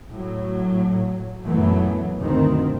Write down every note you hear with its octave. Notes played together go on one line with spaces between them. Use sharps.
A2 F#3
F#2 A#2 E3 F#3 A3 B3
G1 D2 B2 D#3 C4